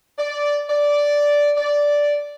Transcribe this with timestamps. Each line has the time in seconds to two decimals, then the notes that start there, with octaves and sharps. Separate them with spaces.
0.19 D5
0.70 D5
1.57 D5